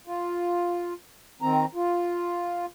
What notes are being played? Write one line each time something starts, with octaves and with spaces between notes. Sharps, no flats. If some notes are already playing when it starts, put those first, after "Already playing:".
F4
D#3 C4 A#5
F4